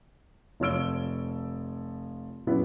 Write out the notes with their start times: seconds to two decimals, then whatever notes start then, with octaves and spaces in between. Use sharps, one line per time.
0.60 F1 F3 C#5 E6 D7 G7
2.47 A#2 C#3 F#3 B3 E4